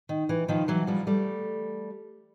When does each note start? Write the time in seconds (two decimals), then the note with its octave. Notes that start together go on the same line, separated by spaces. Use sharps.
0.09 D#3
0.29 E3
0.48 D#3 F3
0.68 E3 F#3
0.87 F3 G3
1.07 G3 A3